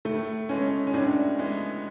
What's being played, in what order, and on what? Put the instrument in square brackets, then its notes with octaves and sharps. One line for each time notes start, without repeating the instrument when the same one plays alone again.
[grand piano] A2 [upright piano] A3
[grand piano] E3 G#3 B3 [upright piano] C#4
[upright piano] C#4
[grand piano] A2 [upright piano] D4
[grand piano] E3 G#3 B3